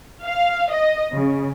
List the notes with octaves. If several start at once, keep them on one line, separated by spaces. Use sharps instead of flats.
F5
D#5
C#3